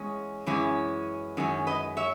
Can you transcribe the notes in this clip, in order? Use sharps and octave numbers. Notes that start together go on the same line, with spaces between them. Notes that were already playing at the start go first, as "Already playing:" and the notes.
Already playing: E2 G#3 C#4
F#2 E3 G#3 C#4
F#2 D#3 G#3 C#4
B4 D#5
C#5 E5